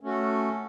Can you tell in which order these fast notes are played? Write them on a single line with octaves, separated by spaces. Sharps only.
C#4 A3 F#4 A4